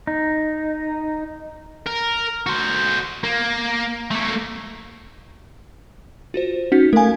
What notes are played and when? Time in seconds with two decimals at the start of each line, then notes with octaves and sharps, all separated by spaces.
0.07 D#4
1.86 A#4
2.46 F#4 C5
3.24 A#3
4.11 A3 A#3
6.34 F4 F#4 C5
6.72 C#4 D#4 F#4 B6
6.93 A3 A#4 F5 G#5